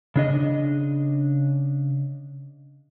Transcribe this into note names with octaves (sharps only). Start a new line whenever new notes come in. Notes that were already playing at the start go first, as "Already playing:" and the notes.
C#3 D4 D#5